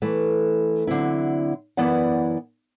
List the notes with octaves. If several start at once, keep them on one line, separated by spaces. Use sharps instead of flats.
E3 A3
D3 F#3 C4 E4
F#2 E3 B3 E4 D5 F#5